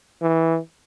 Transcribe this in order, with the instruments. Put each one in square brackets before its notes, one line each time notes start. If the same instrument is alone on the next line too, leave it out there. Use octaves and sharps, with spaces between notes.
[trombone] E3